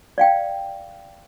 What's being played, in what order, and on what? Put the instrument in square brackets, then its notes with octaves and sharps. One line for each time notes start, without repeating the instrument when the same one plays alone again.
[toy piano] D5 F5 G5